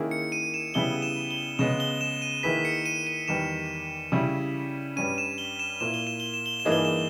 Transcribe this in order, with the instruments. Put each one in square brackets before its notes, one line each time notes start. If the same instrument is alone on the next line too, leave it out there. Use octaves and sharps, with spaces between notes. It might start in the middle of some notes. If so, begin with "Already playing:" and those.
Already playing: [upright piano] D#3 A#3 C#4 E4 G#4
[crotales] C#7
D#7
E7
[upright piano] C#3 G3 B3 E4 G#4 [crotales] G7
[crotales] E7
G7
[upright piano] C#3 G#3 B3 [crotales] E7
[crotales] G7
E7
D#7
[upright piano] D#3 A#3 E4 G#4 B4 [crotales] B6
[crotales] C#7
D#7
D#7
[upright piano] E2 D#3 G3 [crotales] E7
[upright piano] C#3 G3 C#4 E4
[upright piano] G2 G3 C#4 [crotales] D#7
[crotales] E7
G7
E7
[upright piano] A#2 A#3 E4 [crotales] E7
[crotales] G7
E7
G7
E7
G7
E7
[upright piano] G2 E3 A#3 D#4 G#4
[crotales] G7
E7